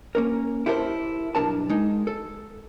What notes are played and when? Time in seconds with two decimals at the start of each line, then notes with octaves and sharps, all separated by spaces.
0.15 A#3 C#4 A#4
0.66 E4 G4 A4 A#4 C5
1.35 B1 G2 B2 D4 A#4 A5
1.70 G#3 D#4
2.07 A4